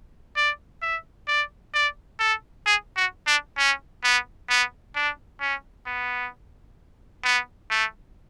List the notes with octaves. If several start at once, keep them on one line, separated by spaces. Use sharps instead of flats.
D5
E5
D5
D5
A4
G#4
F#4
D4
C#4
B3
B3
D4
C#4
B3
B3
A3